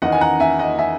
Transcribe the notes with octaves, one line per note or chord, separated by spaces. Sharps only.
E2 D#3 D#5 F#5
G#5
F#5 A#5
E5 G#5
D#5 F#5
E5 G#5